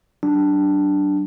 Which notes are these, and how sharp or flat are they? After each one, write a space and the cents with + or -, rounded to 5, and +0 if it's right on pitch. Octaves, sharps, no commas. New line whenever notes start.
F#3 +40 D4 +0